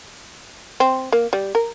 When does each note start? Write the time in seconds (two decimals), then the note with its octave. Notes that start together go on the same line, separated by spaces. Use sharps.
0.80 C4
1.12 A#3
1.33 G3
1.55 A#4